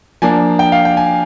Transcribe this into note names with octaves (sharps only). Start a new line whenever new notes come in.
F3 A#3 D4 G#5
G5
F5
G5
G#5